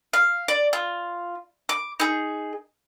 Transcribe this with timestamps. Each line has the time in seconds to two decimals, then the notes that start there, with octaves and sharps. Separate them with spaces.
0.13 F5
0.48 D5
0.73 F4
1.69 D6
2.00 D#4 G#4